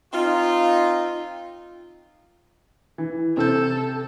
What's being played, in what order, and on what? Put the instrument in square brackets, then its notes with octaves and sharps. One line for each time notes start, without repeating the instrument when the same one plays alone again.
[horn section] C4 D#4 F4
[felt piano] E3
[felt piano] C3 G6 [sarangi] A4